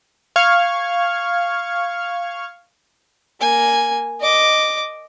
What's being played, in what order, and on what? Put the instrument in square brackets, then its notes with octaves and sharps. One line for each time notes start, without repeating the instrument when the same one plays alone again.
[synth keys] F5 C#6 F6 G#6
[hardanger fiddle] A#3 G#5
D#5 D6